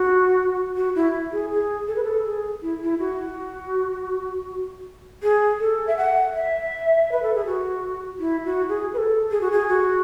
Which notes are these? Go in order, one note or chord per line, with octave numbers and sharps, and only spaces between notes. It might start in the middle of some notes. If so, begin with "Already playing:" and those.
Already playing: F#4
F#4
E4
G#4
G#4
A4
B4
A4
G#4
E4
E4
F#4
G#4
A4
E5
F#5
E5
B4
A4
G#4
F#4
E4
F#4
G#4
B4
A4
G#4
F#4
G#4
F#4